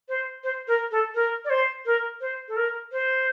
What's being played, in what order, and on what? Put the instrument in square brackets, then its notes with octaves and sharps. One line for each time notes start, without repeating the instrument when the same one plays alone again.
[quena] C5
C5
A#4
A4
A#4
D5
C5
A#4
C5
A4
A#4
C5